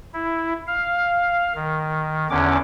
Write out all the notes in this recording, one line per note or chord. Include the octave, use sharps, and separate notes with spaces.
E4
F5
D#3
E2 D3 C#4 D6